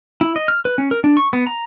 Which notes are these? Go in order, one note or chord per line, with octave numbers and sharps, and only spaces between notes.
E4
D#5
F6
B4
C#4
A#4
D4
C#6
B3
A#5